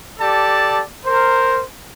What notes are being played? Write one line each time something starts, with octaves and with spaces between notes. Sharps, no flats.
G4 A4 D5 A5
A#4 C5